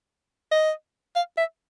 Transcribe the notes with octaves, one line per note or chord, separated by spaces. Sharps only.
D#5
F5
E5